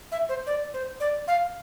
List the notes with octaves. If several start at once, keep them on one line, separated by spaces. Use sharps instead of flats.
E5
C5
D5
C5
D5
F5